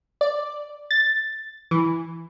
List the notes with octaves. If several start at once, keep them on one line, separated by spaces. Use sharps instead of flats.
D5
A6
E3